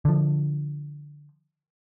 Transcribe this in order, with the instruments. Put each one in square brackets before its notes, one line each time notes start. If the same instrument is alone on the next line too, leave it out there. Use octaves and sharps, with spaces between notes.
[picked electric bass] D3 F3